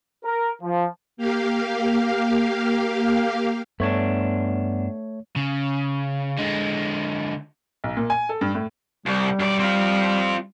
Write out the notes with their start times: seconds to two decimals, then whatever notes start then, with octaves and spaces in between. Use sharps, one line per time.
0.23 A#4
0.62 F3
1.17 A#3 G4 F5
3.80 G2 A3 B3 D4 C#5
5.36 C#3
6.38 D3 G#3
7.84 B1
7.97 A#2
8.10 G#5
8.29 A4
8.41 G2
8.55 A2
9.06 C2 G3
9.39 F#2 D5
9.60 C4 F4